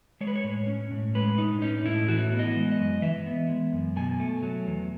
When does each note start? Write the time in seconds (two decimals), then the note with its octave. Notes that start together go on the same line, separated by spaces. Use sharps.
0.21 G#3 C#5
0.27 B4
0.35 C#5
0.44 A2
0.67 C#4
0.91 A2
1.15 G#3 B4
1.38 A2 D#4
1.62 C#4 D#4
1.85 A2 E4
2.08 E3 F#4
2.32 B3
2.39 D#5
2.55 G#3
2.72 D#5
2.79 F#2
3.02 E3 E5
3.26 B3
3.49 G#3
3.72 F#2
3.96 B2 G#5
4.20 A3
4.43 F#3
4.67 E2